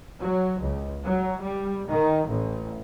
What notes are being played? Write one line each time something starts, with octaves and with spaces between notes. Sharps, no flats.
F#3
C#2
F#3
G3
D#3
A1